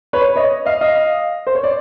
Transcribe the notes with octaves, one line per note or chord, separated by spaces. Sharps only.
B4 C#5
C#5 D#5
D#5 F5
D#5 F5
C5
C#5
D5